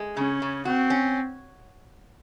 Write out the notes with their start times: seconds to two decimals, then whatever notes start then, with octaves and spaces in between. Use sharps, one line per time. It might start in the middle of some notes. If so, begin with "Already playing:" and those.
Already playing: G#3
0.16 C#3 C#4
0.42 C#3
0.65 C4 F#4
0.90 C#4